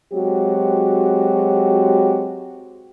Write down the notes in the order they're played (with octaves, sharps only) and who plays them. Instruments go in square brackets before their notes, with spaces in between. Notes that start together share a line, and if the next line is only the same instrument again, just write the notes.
[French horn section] F#3 G#3 C4 F#4 G4